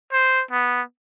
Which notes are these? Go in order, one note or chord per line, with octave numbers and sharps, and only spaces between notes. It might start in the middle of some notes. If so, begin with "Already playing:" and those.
C5
B3